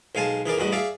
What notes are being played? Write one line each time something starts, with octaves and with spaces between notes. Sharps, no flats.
B1 G#3 F5 G#5 A5
E3 G#4 A#4 D5
A1 E2 G3 F#4 D#5
G#4 D5 E5 F5